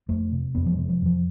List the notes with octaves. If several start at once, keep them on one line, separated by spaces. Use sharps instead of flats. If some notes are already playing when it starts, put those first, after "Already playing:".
F2 A3
C3
F2 B3
F3
G#3
C3
F3
F2
F3